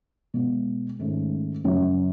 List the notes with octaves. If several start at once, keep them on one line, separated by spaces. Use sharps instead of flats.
B2 G#3 B3
G#2 D#3 A3 C#4
F#2 C#3 F#3